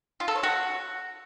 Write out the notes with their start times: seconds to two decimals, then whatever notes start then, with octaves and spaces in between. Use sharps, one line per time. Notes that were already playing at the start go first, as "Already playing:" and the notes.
0.20 F4
0.28 A4
0.36 C#5
0.43 F#4